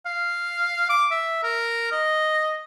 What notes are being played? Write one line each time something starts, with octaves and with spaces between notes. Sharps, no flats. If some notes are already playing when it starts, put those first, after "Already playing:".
F5
D6
E5
A#4
D#5